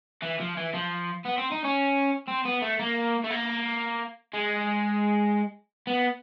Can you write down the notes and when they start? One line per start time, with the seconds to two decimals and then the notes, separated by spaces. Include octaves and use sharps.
0.23 E3
0.40 F3
0.57 E3
0.74 F3
1.25 B3
1.38 C4
1.51 D#4
1.64 C#4
2.28 C4
2.45 B3
2.62 A3
2.79 A#3
3.24 A3
3.31 A#3
4.34 G#3
5.87 B3